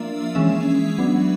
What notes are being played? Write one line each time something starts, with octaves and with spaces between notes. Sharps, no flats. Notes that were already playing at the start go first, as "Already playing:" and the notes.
Already playing: F3 A#3 D4 E5
E3 G#3 C#4 E5
F#3 B3 D4